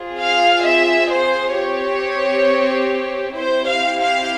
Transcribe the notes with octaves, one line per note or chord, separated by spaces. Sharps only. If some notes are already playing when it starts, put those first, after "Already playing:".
Already playing: C4 F4 G#4
F5
E5
C5
C4 G4 C#5
C4 E4 G4 C5
F5
F5